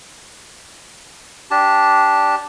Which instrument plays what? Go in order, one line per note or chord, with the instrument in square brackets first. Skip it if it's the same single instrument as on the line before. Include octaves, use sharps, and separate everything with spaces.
[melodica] D4 G4 A5